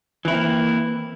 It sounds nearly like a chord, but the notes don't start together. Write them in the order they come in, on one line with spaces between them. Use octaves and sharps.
E3 E4 C4 A#3